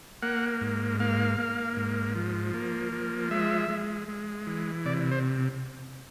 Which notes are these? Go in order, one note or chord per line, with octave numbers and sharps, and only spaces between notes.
A#3 F#5
G#2
A#3 F5
A#3
G#2
F3
A#3
F3
G#3 E5
G#3
G#3
E3
C3 D5
C5